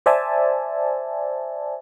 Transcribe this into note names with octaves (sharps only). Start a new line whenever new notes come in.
C5 D5 E5 G#5 A5